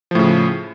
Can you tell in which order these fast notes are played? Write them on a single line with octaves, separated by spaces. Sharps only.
F3 A2 C#3